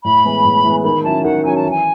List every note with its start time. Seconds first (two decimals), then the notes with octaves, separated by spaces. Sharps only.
0.04 A2 B5
0.25 E3 G#3 B3
0.45 A2
0.64 E3 G#3 B3
0.84 D#3 B5
1.03 F#3 C#4 E4 A5
1.24 D#3 F#5
1.43 F#3 C#4 E4 G#5
1.56 A5
1.64 E3
1.70 G#5